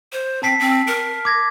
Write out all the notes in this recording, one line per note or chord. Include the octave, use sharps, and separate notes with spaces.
C5
C4 A5 B6 C7
C4
A#4
D6 G#6 A#6